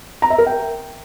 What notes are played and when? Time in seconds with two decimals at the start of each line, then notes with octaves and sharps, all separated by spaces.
0.22 A#5
0.30 E5
0.38 A#4
0.46 G5